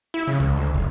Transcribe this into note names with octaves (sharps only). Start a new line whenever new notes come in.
E4
C#3
C#2
D2
F#1